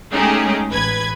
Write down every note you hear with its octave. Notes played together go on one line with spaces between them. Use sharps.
G#3 A3 C#4 D#4 G4 G#4
A1 B4 G#6